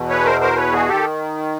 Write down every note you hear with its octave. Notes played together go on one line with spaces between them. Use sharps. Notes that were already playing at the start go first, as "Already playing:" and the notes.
Already playing: E2 B2
B4 C#5
A#4 C5
A#4 C5
B4 C#5
F#4 G#4
D#3 G4 A4